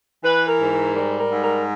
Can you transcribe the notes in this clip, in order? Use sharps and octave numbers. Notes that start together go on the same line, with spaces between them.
E3 B4
A#4
G#2
A#4
G3 A#4
A#4
G#2
A#4